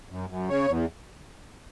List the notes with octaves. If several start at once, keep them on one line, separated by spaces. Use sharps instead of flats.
F#2
F#2
C#3 C#5
E2